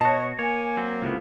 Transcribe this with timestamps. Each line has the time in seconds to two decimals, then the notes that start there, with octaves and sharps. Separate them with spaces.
0.01 B2 F#4 C#5 D#5 A5 C#6
0.39 A#3 C#5 G#5
0.77 F#3 C4
1.02 C#2 C3 B3 E4 F4 A4